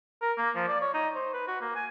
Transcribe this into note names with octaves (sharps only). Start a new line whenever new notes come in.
A#4
A#3
F3
D5
C#5
D#4
C5
B4
F#4
A#3
G#5